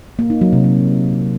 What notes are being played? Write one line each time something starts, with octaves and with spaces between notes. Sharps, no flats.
A#3
D#4
F#3
C3
F#3